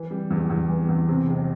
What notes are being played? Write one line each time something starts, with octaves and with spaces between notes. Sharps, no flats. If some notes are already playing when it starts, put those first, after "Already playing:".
Already playing: E3
G3
E2
E2
E3
E2
C3
F1